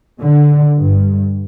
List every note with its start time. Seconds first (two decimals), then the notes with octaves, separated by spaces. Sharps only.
0.21 D3
0.78 G2